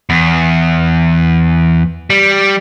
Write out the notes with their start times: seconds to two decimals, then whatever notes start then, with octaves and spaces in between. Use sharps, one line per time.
0.10 E2
2.10 G3